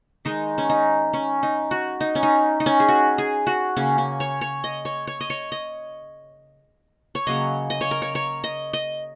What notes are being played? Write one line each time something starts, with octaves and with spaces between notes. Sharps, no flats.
D#3 G#3 D#4
C#4
D#4
C#4
D#4
F#4
D#4
C#4
D#4
D#4
C#4
G#4
F#4
G#4
F#4
C#3 A#3 C#4
C#4
C#5
C#5
D#5
C#5
C#5
D#5
C#5
D#5
C#5
C#3 F#3 A#3 D#5
D#5
C#5
A#4
C#5
C#5
D#5
D#5